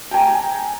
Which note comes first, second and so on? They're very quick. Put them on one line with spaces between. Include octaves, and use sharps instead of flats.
G5 G#5 A#5